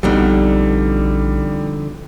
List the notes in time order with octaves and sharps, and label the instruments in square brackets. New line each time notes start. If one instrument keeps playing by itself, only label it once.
[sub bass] A#1 [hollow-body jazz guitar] F2 B2 D3 [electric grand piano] G3 D#4